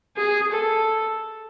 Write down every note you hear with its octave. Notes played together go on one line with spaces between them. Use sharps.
G#4
A4